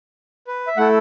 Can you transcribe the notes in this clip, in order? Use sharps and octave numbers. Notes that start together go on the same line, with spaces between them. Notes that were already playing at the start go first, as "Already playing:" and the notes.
B4
E5
A3 E4 A4 F#5